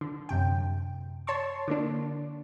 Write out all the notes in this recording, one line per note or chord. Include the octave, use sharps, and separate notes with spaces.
D3
F#2 C3 G5
C#5 A5 C6 C#6
D3 A#3 D4